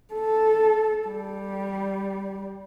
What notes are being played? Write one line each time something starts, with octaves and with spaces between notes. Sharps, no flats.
A4
G3